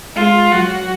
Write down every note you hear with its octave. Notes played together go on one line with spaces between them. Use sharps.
G#3 F4
F#3 F#4